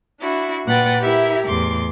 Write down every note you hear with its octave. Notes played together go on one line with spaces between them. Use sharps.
D4 E4 F#4
A#2 A#3 B4 F#5 G5 A6
E4 G4 A#4 E5
E2 A2 C6 D6